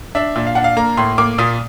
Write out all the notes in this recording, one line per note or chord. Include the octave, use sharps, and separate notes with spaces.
D4 E5
A#2
F5
D4 F#5
F5
A#3 A#5
A2 C6
A#3 D6
A#2 D#6